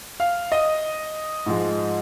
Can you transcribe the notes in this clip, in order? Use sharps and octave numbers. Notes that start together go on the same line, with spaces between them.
F5
D#5
G#2 F3 G#3